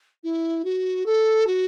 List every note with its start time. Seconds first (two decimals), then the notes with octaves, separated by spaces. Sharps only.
0.24 E4
0.65 F#4
1.06 A4
1.47 F#4